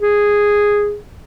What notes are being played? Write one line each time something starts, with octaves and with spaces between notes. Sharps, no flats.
G#4